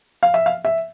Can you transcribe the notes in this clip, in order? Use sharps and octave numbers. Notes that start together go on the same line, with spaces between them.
F5
E5
F5
E5